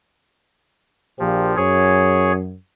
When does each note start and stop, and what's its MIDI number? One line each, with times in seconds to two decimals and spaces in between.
1.19 1.53 34
1.19 1.53 46
1.19 1.56 53
1.19 1.53 67
1.57 2.54 42
1.57 2.32 68
1.57 2.32 73